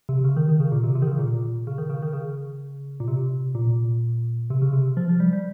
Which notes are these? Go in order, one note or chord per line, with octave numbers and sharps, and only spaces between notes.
C3
C#3
D#3
D#3
C#3
A#2
C3
C3
D#3
C#3
A#2
C#3
D#3
C#3
D#3
C#3
A#2
C3
A#2
C3
C#3
C3
F3
F3
G3
G3